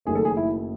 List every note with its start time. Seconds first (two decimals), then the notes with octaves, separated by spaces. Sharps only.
0.05 F#1 F#2 D#3 A3 G#4
0.15 A4
0.25 G#4
0.37 E4